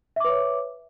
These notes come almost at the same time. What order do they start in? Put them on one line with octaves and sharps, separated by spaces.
E5 D6 B4 C#5